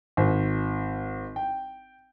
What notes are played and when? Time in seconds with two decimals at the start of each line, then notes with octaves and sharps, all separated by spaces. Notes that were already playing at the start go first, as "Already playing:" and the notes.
0.17 G#1
1.36 G5